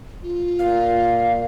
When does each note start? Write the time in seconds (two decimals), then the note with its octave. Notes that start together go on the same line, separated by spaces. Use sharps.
0.23 F4
0.59 A#2 F5